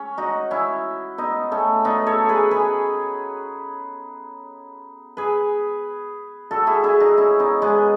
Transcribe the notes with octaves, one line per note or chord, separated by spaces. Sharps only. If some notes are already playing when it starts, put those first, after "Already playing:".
Already playing: C#4
D#4 F#4
C#4 E4
B3 D#4
A3 C#4
B3 D#4
A4 C#5
G#4 B4
G#4 B4
G#4 B4
F#4 A4
E4 G#4
E4 G#4
D#4 F#4
C#4 E4
B3 D#4
G#3 B3